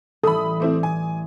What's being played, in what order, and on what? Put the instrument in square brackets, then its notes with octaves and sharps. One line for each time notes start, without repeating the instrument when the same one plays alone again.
[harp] A1 E3 G3 [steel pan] A4 [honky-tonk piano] B5 D#6
[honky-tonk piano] A3 C4 E4 [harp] D6
[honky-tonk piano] G#5